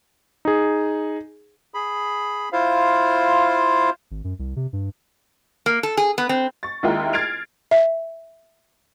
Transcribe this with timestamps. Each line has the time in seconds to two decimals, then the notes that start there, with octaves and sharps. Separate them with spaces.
0.45 D#4 G#4
1.74 G#4 B5
2.52 E4 F4 C5 F5
4.11 G#1
4.24 F#2
4.39 C2
4.56 C3
4.73 G2
5.66 A#3
5.83 A4
5.97 G#4
6.18 B3
6.29 C4
6.63 C#6 A6
6.83 D#2 G#3 E4 F4 A#4 G5
7.13 F6 G#6 A6 C7 D7 F7
7.71 E5